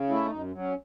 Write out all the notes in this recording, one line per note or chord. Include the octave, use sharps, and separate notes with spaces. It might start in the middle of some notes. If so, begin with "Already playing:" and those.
Already playing: C#3
A3 E4
D#4
F#2
F#3
C#4